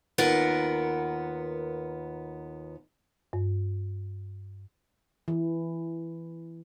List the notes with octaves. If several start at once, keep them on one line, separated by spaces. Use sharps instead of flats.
D#2 B3 F4 A#4 F#5
G2
E3